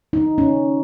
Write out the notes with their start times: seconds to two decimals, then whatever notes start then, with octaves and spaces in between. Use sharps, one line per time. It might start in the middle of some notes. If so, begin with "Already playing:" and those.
0.13 D#4
0.38 C#4